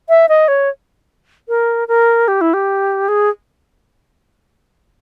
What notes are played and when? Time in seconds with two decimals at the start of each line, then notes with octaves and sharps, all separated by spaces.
0.09 E5
0.29 D#5
0.48 C#5
1.48 A#4
1.88 A#4
2.28 G4
2.41 E4
2.54 G4
3.08 G#4